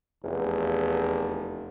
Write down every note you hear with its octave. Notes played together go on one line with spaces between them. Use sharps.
F1 E2